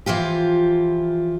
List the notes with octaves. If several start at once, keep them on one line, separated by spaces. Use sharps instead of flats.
E3 F3 F4 G4